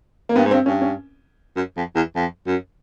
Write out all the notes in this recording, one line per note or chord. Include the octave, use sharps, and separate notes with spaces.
A#3
G2 B3
G#2
G2 C4
G2 C#4
C#4
F#2
F2
E2
F2
F#2